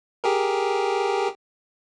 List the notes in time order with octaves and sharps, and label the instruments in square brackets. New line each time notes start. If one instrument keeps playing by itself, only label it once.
[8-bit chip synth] G4 G#4 A#4